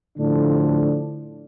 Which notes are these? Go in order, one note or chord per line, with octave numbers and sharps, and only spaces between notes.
A2 D3 F3 D4